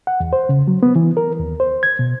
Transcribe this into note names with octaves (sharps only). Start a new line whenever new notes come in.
F#5
E2
C5
C#3
F#3
B3
E3
A#4
D#2
C5
G#6
B2